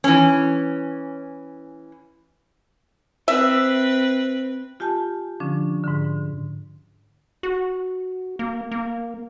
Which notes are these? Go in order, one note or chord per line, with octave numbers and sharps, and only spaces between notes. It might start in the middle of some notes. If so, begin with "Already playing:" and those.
E3 C#4
C4 B4 E5
F4 G4 G#5 A5 G6
D3 F3 C#4 D4
G#2 D3
F#4
A#3
A#3